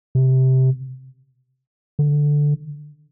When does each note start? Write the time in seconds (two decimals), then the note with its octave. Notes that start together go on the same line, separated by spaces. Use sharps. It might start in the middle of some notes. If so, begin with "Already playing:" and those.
0.15 C3
1.99 D3